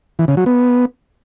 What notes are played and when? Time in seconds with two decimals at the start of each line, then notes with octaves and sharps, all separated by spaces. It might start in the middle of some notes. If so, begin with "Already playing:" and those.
0.19 E3
0.28 C#3
0.37 F#3
0.46 B3